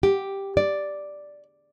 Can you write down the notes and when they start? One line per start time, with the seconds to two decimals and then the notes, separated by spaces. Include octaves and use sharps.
0.03 G4
0.57 D5